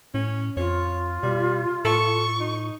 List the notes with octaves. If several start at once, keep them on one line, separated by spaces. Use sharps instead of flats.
A2 C#4
F2 F4 C#5
B2 G3
A2 A4 C#6
D#4